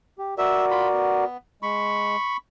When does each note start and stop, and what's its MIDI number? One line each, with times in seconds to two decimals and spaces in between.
0.19 0.34 67
0.38 1.24 66
0.38 1.24 70
0.38 1.24 74
0.38 0.65 76
0.71 0.88 65
0.71 0.88 83
0.92 1.37 59
1.62 2.16 56
1.62 2.37 83
1.62 2.37 85